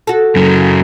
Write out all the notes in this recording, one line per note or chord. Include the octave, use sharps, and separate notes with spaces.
F#4 A4
F#2 C#3 F#3